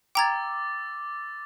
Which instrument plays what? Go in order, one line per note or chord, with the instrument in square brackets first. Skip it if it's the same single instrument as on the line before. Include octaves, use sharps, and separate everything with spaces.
[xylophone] G5 A#5 G#6 [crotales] D6 E6 A6